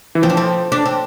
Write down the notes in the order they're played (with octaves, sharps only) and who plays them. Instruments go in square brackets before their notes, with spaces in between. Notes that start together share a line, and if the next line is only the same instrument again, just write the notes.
[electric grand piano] E3
[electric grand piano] F3 [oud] C4
[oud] D4
C4
D4
C4